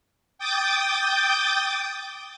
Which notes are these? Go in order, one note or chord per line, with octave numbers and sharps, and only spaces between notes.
G5 D6 D#6 G6 A6